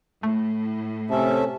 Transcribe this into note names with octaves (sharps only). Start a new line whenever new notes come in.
A2 A3
C3 C#4 A4 E5